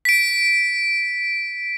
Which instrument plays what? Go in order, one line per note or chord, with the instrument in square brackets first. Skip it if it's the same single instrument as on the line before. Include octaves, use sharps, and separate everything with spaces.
[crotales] B6 D7